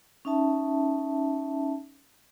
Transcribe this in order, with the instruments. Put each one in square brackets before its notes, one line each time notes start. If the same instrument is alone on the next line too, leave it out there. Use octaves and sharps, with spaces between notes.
[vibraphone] C#4 D#4 E5 A5